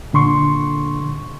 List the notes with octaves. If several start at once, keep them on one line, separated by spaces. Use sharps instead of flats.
A#2 D3 C6 C#6